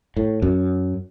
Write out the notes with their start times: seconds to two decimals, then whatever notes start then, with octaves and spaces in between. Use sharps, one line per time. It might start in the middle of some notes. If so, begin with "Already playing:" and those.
0.17 A2
0.42 F#2